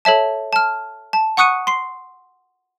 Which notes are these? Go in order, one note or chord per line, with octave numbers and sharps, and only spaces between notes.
A4 C#5 E5 A5
A5 F6
A5
F#5 C#6 D#6 F#6 C#7 D#7
C6 C7